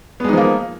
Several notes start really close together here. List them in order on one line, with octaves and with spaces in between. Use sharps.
B3 G#3 D#4 F3 A#3